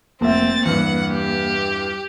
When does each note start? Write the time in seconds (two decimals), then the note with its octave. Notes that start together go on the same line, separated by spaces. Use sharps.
0.21 F1 A#3 C4 E5 A6
0.65 E2 G2 F#5
1.11 G4